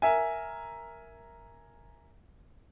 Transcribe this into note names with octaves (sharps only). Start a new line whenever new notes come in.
A#4 E5 G#5